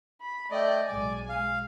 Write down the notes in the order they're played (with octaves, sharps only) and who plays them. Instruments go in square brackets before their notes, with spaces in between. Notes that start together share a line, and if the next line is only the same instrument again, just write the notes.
[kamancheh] B5
[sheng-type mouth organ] A3 D#5 [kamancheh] D5 G5
[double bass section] B1 G#3 [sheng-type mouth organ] D5 [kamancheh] G#5
[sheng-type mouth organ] F5